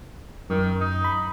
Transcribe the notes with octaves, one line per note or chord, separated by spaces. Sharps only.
F#2 D#3
D#4
B5